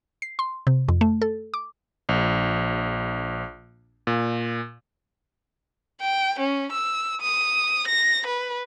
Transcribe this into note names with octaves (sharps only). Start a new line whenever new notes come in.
C7
C6
C3
F2
A3
A4
D6
A#1
A#2
G5
C#4
E6
D#6
A#6
B4